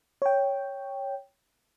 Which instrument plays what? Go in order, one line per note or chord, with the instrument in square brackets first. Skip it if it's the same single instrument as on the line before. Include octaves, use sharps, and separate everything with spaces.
[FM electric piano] C#5 G5